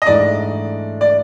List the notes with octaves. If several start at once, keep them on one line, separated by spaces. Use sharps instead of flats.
D#5
G#2 E3 A3 D4 D5
D5